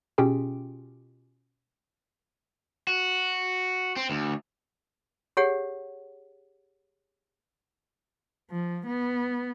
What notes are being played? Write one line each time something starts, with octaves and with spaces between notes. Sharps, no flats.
B2 C#4 F4 G4 G#4 G5
F#4
C4
D2
G4 G#4 C#5 F#5
F3
B3